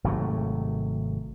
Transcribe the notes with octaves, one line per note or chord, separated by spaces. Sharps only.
G#1 C3 F#3 A3